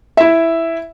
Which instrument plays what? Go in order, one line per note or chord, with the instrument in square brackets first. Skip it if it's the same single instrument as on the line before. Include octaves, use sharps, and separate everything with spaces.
[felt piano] E4 E5